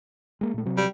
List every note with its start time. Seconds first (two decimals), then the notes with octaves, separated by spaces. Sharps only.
0.41 G#3 A#3
0.54 A#2 A3
0.65 C3 F#3 C4
0.77 G3